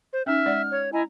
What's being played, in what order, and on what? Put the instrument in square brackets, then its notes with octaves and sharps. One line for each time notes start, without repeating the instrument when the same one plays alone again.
[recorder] C5
[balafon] C#4 D#4 [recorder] E5 [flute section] F6
[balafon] G#3 D5 F#5
[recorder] C#5
[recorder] E4 [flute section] D#5 G#5 A#5